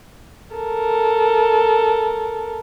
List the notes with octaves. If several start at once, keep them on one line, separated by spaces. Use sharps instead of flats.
A4 A#4